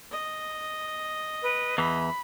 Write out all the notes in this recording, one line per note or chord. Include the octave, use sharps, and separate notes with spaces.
D#5
B4
E2 E3 B5